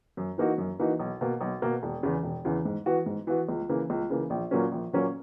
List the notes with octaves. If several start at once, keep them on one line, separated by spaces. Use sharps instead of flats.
F#2
E3 A#3 D#4 F#4
F#2
E3 A#3 D#4 F#4
B1
B2 A#3
B1
B2 A#3
E1
E2 C#3 E3
E1
E2 C#3 E3
G#2
E3 B3 F#4
G#2
E3 B3 F#4
C#2
C#3 E3 A#3
C#2
C#3 E3 A#3
A#1
A#2 F#3 A#3 C#4
A#1
A#2 F#3 A#3 C#4